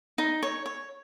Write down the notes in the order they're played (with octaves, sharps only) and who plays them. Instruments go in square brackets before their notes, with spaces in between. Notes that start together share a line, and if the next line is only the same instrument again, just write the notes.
[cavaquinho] D#4
C#5
C#5